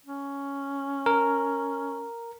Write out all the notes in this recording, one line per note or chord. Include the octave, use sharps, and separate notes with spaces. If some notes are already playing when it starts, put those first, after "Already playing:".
C#4
A#4